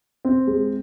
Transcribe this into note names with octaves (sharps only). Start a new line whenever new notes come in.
C4
G#3